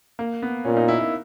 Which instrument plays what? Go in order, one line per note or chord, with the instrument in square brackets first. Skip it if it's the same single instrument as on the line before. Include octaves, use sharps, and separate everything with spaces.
[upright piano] A#3
B3
[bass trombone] A#2 [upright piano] C#4
[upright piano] D#4
E4
E4